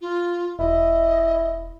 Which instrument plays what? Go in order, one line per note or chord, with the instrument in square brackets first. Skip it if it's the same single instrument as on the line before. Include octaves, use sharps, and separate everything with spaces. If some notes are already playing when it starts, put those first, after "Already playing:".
[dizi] F4
[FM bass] E1 [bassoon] E4 [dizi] D#5